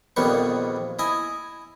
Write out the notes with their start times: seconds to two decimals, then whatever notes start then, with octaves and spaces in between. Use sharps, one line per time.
0.16 A#1 F2 D#3 G3 B3 C#6
0.99 E4 D#5 G#5